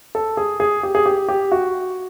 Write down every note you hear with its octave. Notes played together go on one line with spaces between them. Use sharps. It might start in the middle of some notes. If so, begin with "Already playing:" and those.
A4
G#4
G#4
G4
G#4
G4
G4
F#4